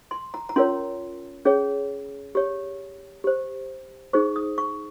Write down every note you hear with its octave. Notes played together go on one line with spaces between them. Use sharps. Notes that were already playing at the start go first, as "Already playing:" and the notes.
C6
A#5
A#5
C#4 F4 A#4 C#5 C6
C#4 G#4 C#5
G4 C#5
G4 C5
D#4 G#4 C5 C#6
D#6
C#6